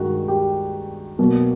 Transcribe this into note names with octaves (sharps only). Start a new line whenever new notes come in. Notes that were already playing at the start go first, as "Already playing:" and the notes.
Already playing: G2 D#3 G#3 F#4
G4
B2 F#3 A#3